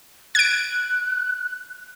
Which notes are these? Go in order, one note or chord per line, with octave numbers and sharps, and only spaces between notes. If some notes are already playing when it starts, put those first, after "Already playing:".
F#6 G#6 D7